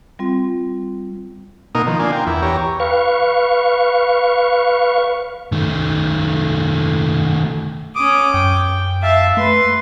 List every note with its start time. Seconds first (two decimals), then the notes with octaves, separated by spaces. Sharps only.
0.19 G3 C4 F4
1.75 B2 A#3 D#4 A#4 D#6
1.87 D#3 F3
2.00 A#3 D4 F4 G#5
2.13 A#4 G5
2.26 E2 E4
2.42 E2 G4 C#5 A#5
2.80 B4 F5 C#6
5.52 D#3 A3
7.95 C#4 D6 D#6
8.34 F#2 G5
9.03 E5 F5 A5
9.37 A3 B4 C6